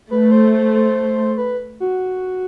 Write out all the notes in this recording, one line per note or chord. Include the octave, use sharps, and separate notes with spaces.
A3 B4
C5
C5
C5
B4
F#4